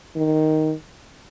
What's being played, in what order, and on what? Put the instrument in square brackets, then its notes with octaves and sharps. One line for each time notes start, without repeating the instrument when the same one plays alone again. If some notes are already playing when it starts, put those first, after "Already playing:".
[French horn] D#3